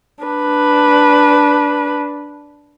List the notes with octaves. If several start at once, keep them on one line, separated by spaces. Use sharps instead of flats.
D4 B4